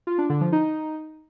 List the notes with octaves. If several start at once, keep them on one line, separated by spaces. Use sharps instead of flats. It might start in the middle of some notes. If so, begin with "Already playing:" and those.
F4
D4
D3
F3
D#4